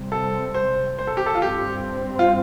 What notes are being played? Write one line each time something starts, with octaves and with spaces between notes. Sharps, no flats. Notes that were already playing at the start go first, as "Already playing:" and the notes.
Already playing: C3 G3 C4
A4
C5
C5
A4
G4
A4
F4
G2 G3 C4 G4
F4